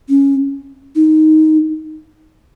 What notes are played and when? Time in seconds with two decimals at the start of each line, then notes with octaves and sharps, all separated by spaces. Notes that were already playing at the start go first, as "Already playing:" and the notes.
0.09 C#4
0.96 D#4